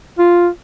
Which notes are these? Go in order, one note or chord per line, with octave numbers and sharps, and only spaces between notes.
F4